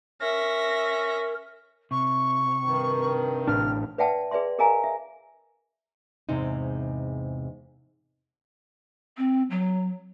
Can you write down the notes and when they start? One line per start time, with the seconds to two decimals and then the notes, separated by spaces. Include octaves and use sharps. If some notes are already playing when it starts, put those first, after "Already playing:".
0.21 C#4 A#4 E5 A#6
1.91 C3 C#6
2.65 G2 D#3
3.47 A1 A2 D4 F6
3.98 B4 D5 E5 F#5 G5 A5
4.31 G#4 B4 D5 E5 C6
4.59 G#4 A#4 D#5 F5 G#5 A#5
4.83 E5
6.29 E2 G#2 C3 D#4
9.17 C4
9.51 F#3